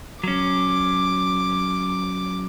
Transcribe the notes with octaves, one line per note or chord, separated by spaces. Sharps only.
F#3 C#4 D6